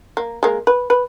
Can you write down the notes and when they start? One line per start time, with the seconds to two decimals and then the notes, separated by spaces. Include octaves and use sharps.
0.17 A#3
0.43 G#3 A#3
0.67 B4
0.90 B4